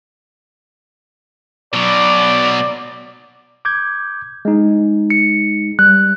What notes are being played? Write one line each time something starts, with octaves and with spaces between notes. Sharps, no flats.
B2 F#3 D5
D6 G6 G#6
G#3 D#4
C#7
G3 F#6